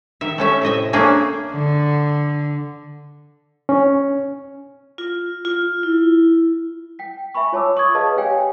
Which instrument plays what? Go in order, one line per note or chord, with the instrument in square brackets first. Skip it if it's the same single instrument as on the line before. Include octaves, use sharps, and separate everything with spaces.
[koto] D#3 E5
A3 C#4 E5
A2 C3 D#5 E5
A3 A#3 C#4 D4 G#4
[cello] D3
[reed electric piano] C#4
[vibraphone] F4
F4
E4
[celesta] G5 B6
E5 G#5 B5 C#6
F4 C#5 A5 D6 E6
C#6 D#6 G#6
G#4 B4 D#5 F5 A5
G4 C#5 F5 G5 G#5